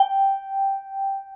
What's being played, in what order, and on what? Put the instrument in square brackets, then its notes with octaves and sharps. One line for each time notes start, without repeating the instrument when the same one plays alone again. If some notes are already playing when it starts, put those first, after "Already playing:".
Already playing: [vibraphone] G5